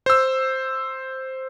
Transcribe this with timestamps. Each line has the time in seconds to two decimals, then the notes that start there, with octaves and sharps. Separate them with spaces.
0.06 C5 E6